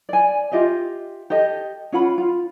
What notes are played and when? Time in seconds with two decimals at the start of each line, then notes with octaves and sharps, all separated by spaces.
0.09 D5 G#5
0.52 F4 G4 D#5 E5
1.30 G4 A4 D#5
1.92 C#4 F4 F#5 B5
2.18 F4